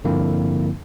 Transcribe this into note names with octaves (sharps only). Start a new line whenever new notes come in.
G2 D3 F3 A#3 C4 E4